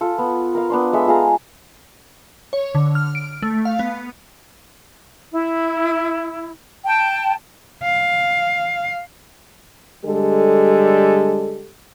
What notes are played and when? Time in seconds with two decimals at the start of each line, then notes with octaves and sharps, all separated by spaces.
0.01 F4 A4
0.18 B3
0.55 A#4 F5
0.70 B3 D4 C6
0.93 G#3 A4 E5 D#6
1.07 F4 G#4 F5 A#5
2.53 C#5
2.75 D3
2.95 F6
3.15 D7
3.42 A3
3.65 F5
3.79 B3
5.32 E4
6.85 G5 A5
7.83 F5
10.04 D3 G3 G#3 G4 A4